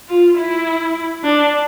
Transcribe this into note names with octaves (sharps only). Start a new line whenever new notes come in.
F4
E4
D4